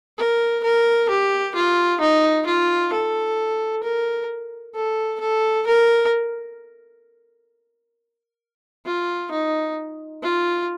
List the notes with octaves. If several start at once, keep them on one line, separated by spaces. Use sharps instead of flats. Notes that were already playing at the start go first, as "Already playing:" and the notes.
A#4
A#4
G4
F4
D#4
F4
A4
A#4
A4
A4
A#4
F4
D#4
F4